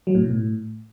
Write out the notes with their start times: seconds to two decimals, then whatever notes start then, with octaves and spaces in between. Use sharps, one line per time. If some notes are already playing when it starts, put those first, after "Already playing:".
0.07 F#3
0.15 A2
0.23 B2
0.30 A2